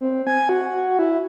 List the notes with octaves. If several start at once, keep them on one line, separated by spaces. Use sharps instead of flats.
C4
G#5
F#4
E4